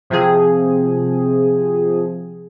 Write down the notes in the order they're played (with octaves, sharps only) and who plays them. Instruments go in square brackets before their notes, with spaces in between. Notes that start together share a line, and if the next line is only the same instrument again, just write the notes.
[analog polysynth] C3 F3 G#4